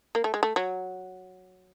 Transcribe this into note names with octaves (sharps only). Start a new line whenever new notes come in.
A#3
A3
G#3
A3
F#3